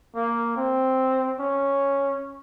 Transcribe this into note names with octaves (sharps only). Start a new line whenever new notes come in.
A#3
C4
C#4